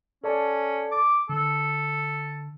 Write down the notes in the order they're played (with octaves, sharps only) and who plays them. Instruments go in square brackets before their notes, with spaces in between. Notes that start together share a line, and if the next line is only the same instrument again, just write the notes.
[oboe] C#4 [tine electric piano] A4 D5 A5
[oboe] D6
[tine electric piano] D3 [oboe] A4